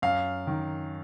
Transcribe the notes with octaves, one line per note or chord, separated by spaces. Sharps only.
F#2 F5
D#3